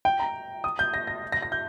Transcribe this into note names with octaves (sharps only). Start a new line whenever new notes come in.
G5
A#5
D#6
G6
A#6
A#6
A#6
A#6
G6